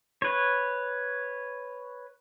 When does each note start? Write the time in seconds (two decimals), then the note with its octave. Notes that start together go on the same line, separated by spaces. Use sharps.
0.22 B4 C#5